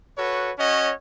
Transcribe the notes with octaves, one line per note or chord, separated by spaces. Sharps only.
F#4 A4 B4 C#5
C#4 F#4 C#5 D#5